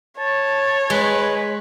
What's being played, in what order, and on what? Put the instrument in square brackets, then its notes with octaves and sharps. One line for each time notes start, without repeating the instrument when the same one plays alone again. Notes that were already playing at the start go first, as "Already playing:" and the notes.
[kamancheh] C#5 [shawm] A5
[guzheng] G#3 [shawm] B4